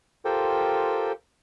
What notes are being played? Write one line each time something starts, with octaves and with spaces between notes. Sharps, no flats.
F4 G4 A4 A#4 C5 G5